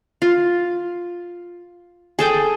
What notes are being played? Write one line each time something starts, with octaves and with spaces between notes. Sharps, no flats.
F4
G#4 A4 G5